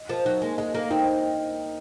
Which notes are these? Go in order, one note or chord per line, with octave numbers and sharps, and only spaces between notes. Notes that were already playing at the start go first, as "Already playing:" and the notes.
Already playing: D#5
F3 A#4
F#3 D#4
G#3 A#3
G#3 D#5
A#3 A#4
C4 D#4